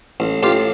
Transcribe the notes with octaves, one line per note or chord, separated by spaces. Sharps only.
A1
A1 F4 G4